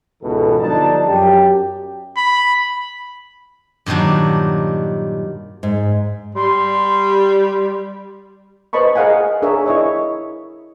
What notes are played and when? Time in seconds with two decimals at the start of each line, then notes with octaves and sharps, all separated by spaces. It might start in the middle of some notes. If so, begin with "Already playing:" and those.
0.22 C#2 G#2 B2 E3 A4
0.59 G1 F3 D4 D#4 D5 A5
1.08 F#2 G4
2.17 B5
3.86 G2 A#2 D#3 F#3 D4
5.63 G#2
6.35 G3 C6
8.73 B4 C5 D#5 A5 B5 C#6
8.96 G#4 A#4 D#5 F5 F#5 G#5
9.42 D4 G#4 A#4 C#5 E5
9.66 E4 G#4 C#5 D#5 E5